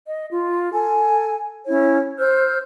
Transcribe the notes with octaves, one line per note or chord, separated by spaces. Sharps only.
D#5
F4
A4 G#5
C#4 E4 C#5
C5 E6 F6 G6